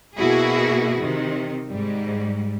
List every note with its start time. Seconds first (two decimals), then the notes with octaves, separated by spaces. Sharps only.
0.15 B2 A#3 E4 F#4 G#4
1.00 C3 D#3
1.68 G#2 G3